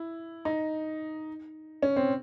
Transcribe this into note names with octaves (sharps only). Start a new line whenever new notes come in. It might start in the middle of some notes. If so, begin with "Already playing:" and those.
Already playing: E4
D#4
C#4
C4